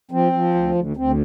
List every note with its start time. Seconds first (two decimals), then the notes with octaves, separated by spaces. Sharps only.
0.11 F3 C4
0.32 F3
0.54 D2
0.75 D2
0.97 D2 C4